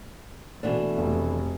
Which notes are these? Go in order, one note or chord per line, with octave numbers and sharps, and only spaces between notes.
B2 E3 A3 D4
F1